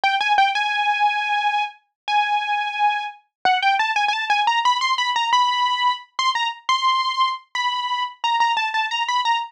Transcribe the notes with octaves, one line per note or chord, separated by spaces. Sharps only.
G5
G#5
G5
G#5
G#5
F#5
G5
A5
G#5
G#5
A5
G#5
A#5
B5
C6
B5
A#5
B5
C6
A#5
C6
B5
A#5
A#5
A5
A5
A#5
B5
A#5